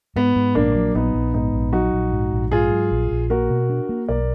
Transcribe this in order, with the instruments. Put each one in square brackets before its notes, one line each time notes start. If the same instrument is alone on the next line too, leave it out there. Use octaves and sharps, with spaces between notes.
[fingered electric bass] G#2 [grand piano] B3
[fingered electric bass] G#2
[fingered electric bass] A#1 [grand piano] A#3 D4
[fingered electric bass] F#3
[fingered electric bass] A#1 [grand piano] B3 D#4
[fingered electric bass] A#1
[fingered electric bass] G#2 [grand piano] B3 D#4
[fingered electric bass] A#1
[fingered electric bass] F#3 [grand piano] D#4 F#4
[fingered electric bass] A#1
G#2
A#1
[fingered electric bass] G#2 [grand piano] F4 G#4
[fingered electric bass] F#3
A#1
A#1
[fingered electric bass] A#3 [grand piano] F#4 A#4
[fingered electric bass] B2
D4
A#3
[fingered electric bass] B1 [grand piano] A#4 D5